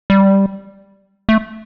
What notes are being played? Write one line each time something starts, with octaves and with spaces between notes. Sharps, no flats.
G3
A3